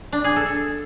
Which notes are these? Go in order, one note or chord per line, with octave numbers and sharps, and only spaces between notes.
D4
G#4
A4